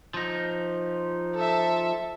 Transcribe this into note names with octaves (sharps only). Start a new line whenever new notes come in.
F3 D#4
A4 E5